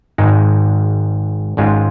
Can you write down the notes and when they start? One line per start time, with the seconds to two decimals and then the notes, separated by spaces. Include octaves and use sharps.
0.18 G#1 G#2 G#3 D#4
1.57 G#1 G#2 G#3 C#4 F4